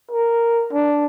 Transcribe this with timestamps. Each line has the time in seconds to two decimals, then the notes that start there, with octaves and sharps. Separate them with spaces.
0.11 A#4
0.73 D4